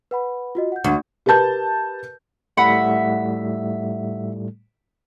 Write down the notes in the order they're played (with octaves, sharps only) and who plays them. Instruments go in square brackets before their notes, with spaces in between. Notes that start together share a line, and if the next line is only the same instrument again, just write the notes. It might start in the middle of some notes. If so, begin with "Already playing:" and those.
[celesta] B4 F#5 B5
F4 F#4 D#5
F#5 G6
[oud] D2
[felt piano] G4 A#4 B4 A5 G6
[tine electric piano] A2 G3 A3 [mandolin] E5 F#5 B5